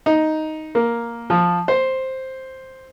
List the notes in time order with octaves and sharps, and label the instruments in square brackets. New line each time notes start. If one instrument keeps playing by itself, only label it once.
[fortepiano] D#4
A#3
F3
C5